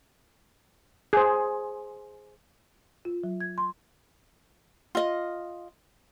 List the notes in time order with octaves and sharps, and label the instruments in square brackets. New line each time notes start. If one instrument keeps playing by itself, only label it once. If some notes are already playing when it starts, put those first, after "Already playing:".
[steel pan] G#4 C5
[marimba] F4
F#3
G#6
C6
[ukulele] F4 D#5